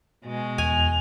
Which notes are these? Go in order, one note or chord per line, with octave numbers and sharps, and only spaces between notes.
B2 G#3
E2 G#5 F7